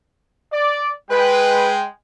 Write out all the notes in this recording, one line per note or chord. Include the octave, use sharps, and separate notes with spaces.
D5
G#3 B4 G5